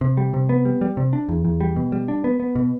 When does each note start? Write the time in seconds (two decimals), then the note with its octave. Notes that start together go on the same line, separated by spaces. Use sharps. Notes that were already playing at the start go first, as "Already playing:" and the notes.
0.01 C3
0.17 G3
0.34 C3
0.49 B3
0.65 G3
0.81 G3
0.97 C3
1.13 D4
1.29 E2
1.45 E2
1.60 G3
1.76 B2
1.92 G3
2.08 D4
2.24 B3
2.40 B3
2.55 B2